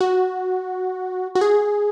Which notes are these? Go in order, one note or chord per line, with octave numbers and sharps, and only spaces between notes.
F#4
F#4
G#4